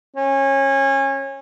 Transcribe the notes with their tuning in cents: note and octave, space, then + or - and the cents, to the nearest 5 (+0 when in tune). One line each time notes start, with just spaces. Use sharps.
C#4 -25